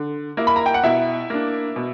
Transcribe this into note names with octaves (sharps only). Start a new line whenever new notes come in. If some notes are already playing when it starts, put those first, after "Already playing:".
Already playing: D3
A#3 E4
B5
A#5
G5
F#5
B2 E4 E5
A#3 D4
B2